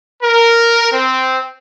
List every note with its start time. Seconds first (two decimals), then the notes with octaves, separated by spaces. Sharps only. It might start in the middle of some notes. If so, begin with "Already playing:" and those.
0.23 A#4
0.92 C4